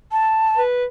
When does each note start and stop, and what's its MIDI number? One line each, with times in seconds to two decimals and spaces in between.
0.12 0.61 81
0.57 0.86 71